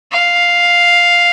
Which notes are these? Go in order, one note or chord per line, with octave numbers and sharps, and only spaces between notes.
F5